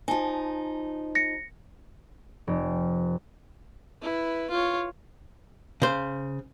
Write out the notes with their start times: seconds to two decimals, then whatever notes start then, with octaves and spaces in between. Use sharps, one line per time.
0.08 F3 D#4 G#5 A5
1.15 A#6 C#7
2.47 F1
4.02 E4 B4
4.50 F4 C#5
5.82 C#3 C5